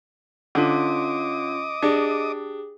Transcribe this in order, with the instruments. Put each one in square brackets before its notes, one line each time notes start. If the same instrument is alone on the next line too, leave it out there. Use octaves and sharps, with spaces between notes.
[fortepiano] D3 [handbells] C#4 F4 [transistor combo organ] D#5 D6 D#6
[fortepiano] D4 [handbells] G4 G#4